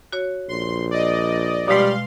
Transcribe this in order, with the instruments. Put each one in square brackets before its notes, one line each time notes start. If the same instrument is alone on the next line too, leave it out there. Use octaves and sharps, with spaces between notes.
[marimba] F#4 C#5
[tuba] A#1 [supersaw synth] C6
[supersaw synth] D5 D#5
[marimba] B2 G#3 [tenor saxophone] G3 [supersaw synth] F5 C6